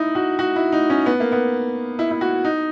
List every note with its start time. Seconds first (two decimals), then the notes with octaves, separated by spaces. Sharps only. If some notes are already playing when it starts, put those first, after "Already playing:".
Already playing: D#4 E4
0.15 F#4
0.39 F#4
0.56 E4
0.72 D#4
0.90 C#4
1.06 B3
1.20 A#3
1.32 B3
1.99 E4
2.11 E4
2.21 F#4
2.44 D#4